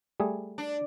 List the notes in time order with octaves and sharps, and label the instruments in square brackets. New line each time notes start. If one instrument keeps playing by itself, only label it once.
[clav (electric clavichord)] G3 A3 G#4
[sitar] D4